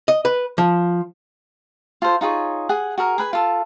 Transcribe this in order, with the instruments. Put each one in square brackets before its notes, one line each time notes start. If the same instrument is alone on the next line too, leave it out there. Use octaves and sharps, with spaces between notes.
[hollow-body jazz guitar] D#5
B4
F3
[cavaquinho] F4 A4 C5
D#4 F4 G#4 C#5
G#4 F#5 G#5
F#4 G#4 A#4
G#4 B4 G#5
F4 A4